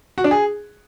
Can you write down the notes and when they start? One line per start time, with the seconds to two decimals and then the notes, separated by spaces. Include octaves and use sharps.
0.18 F#4
0.24 D4
0.31 G#4